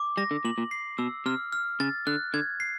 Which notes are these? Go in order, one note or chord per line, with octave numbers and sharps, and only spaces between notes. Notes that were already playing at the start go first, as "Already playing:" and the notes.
Already playing: D6
G3 A#6
D3
A#2 F#7
A#2
C7
B2 E6
C3 F6
F6
C#3 A6
D3 F#6
D3 G#6
C7